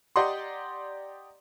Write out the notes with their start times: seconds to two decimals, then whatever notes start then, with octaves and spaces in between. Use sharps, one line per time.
0.16 G4 D5 D#5 F#5 A#5 C6